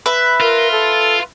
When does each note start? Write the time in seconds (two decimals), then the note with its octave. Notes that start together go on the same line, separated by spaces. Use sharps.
0.06 B4 E5
0.41 F4 A#4
0.72 A4